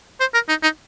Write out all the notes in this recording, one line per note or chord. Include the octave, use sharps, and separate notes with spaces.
C5
A#4
D#4
D#4